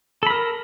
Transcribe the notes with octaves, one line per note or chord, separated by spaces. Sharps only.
A4 A#4 B5